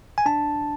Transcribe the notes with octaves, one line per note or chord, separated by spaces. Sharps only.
G#5
D4 A5